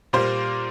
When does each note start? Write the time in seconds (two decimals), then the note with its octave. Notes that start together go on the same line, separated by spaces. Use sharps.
0.13 A#2 G3 A#3 C5